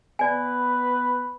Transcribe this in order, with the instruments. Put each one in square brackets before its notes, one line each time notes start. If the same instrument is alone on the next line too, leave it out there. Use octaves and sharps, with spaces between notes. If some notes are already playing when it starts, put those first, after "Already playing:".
[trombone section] B3 B4 [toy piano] D5 G#5